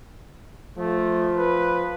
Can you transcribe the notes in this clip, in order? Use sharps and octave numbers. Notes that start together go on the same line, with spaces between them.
F3 A3
B4